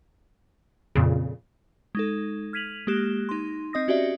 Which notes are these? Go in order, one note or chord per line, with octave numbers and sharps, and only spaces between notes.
F2 A#2 C#3
G#3 D#4 A4
F6 G#6 B6 D#7 F7 F#7
G#3 A#3 G4 F#6 E7
D#4 C6
C4 D#5 D#6 A#6
C#4 F#4 G4 D5 E5